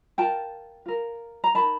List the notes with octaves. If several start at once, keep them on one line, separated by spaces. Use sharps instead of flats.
F4 A#4 G5 A5
F4 A#4
A#5
D#4 F#4 A#4 A5 B5